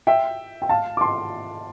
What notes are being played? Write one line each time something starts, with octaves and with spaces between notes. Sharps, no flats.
E5 G5
G5
F5 A5
D6
A5 C6